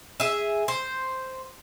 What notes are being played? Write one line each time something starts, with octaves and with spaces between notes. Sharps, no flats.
G#4 E5
C5